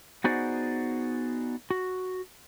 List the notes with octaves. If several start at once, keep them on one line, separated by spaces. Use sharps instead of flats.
B3 D#4 F#4 G#4 C5 D5
F#4